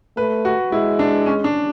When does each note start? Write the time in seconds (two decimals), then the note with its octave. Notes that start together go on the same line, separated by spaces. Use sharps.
0.17 A3 B4
0.45 F#4
0.72 G#3 E4
0.99 D4
1.26 C#4
1.44 D4